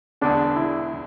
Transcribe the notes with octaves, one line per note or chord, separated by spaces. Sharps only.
E1 E2 D3 D4
E4